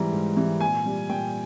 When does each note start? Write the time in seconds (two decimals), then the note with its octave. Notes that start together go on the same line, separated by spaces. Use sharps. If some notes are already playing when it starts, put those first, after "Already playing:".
Already playing: G#2 E3 G3 A#5
0.12 G#2
0.36 E3 G3
0.60 A#2 G#5
0.85 G3
1.10 A#2 G5